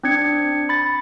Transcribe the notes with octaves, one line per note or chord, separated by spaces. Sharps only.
C4 D4 G#6 C#7
B5 A6